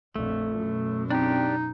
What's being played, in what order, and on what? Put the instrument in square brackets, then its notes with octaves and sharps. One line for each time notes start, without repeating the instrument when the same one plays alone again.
[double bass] A#1 F2 [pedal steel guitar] A3
[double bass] F#2 B2
[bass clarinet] C4 [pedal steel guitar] D4 G4 [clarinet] D#4